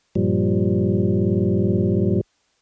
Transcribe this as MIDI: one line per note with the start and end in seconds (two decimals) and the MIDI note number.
0.15 2.21 43
0.15 2.21 46
0.15 2.21 53
0.15 2.21 55